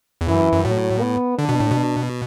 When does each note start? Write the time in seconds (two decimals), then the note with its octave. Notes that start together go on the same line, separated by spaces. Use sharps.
0.21 E2
0.27 F#2 E3
0.52 F#2
0.64 A2 F#3
1.01 B3
1.38 D3 D4
1.49 B2
1.60 A2
1.71 B2